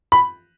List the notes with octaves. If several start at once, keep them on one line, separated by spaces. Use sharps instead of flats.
B5